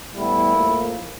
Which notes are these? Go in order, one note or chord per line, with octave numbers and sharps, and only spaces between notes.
A2 E3 G3 B3 E4
A2 F3 A#3